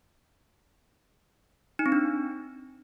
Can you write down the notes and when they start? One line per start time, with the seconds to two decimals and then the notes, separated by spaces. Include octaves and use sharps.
1.79 D#4
1.86 C4
1.92 D4